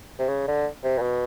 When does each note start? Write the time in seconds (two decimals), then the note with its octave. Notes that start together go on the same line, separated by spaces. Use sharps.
0.19 C3
0.28 C#3
0.48 D3
0.83 C3
0.98 A#2
1.02 B2